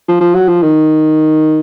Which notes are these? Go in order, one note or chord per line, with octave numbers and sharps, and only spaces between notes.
F3
F3
F#3
F3
D#3